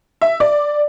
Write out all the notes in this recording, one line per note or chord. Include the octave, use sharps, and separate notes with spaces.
E5
D5